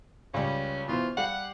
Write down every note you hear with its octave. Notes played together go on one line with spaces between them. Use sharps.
C#2 G3 C#4
B2 E3 F4 C5
G3 G4 F5 F#5